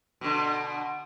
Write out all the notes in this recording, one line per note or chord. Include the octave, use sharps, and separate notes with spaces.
B2 D3